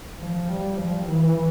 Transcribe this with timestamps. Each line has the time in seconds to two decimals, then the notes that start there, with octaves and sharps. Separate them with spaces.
0.19 F3
0.48 G3
0.77 F3
1.07 E3